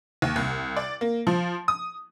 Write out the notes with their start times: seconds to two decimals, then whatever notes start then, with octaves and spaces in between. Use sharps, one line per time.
0.22 D#2
0.36 C2
0.76 D5
1.01 A#3
1.27 F3
1.68 D#6